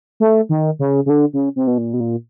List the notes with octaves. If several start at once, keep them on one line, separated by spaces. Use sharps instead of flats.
A3
D#3
C#3
C#3
D3
C#3
C3
B2
A#2
B2
A#2